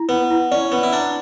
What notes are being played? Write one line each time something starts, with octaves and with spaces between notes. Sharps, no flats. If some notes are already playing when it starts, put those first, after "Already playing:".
Already playing: E4
B3 B4
E4
C#4 D5
B3 B4
E4
D4 A#5